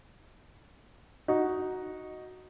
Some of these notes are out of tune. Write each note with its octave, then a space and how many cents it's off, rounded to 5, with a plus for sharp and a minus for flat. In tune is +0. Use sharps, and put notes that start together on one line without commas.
D#4 +0 F#4 +0